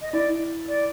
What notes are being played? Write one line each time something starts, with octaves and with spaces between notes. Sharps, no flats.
D#5
E4 D5
D5